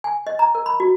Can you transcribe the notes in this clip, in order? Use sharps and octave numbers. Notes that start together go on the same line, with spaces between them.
G#5
D#5
A#5
A#4
B5
F#4